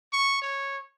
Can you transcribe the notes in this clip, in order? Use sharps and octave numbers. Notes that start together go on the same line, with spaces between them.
C#6
C#5